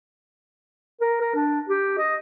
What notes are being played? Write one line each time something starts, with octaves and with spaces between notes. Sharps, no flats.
A#4
A#4
D4
G4
D#5